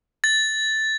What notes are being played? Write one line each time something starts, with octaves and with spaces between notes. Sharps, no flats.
A6